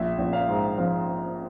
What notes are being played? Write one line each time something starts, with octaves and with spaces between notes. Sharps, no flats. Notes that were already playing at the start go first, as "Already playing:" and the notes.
Already playing: A#1 E5
A#1
F5
G#2
F3 F5